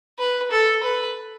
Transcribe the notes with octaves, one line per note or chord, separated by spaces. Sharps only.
B4
A4
B4